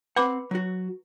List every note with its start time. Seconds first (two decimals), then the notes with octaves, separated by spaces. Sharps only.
0.16 C4 B4 F#5 B5 D6
0.51 F#3 F#4